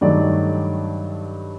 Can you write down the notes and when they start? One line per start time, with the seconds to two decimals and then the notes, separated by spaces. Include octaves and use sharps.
0.01 G2 D#3 F#3 A3 D5